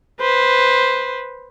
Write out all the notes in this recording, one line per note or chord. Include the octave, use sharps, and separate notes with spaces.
B4 C5